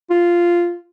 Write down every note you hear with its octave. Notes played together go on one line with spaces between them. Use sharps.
F4